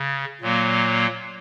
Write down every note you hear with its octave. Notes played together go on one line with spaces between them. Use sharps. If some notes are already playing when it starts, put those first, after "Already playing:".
Already playing: C#3
A#2 F#3 A#3